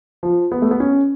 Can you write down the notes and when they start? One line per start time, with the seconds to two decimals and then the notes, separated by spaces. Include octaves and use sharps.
0.23 F3
0.52 B3
0.62 A3
0.71 B3
0.80 C#4